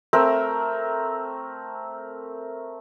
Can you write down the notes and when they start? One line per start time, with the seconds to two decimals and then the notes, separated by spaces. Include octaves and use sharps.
0.13 A3 C4 A#4